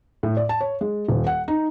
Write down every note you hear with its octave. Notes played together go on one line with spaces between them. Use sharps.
A2
D5
A5
C#5
G#3
D#1
F#5
D#4